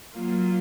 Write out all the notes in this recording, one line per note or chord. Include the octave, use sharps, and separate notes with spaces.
F#3 A#3 F4